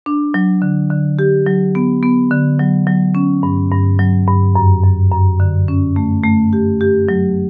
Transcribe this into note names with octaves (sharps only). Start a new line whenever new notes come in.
D4
F#3
D3
D3
G4
F#3
B3
B3
D3
F#3
F#3
C#4
G2
G2
F#3
G2
F#2
F#2
F#2
D3
C#4
A3
A3
G4
G4
F#3